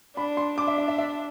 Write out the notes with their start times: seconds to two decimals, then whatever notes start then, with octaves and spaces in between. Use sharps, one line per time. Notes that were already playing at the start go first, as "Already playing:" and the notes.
0.16 D4 B5
0.37 C6
0.58 D4 D6
0.68 E5
0.78 E5
0.88 E5
0.98 E5